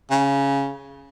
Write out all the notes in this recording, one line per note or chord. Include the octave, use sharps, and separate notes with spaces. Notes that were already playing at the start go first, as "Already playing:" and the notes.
C#3